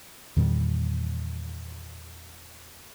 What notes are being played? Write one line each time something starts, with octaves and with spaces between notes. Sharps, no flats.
E2 A#2 D#3 G3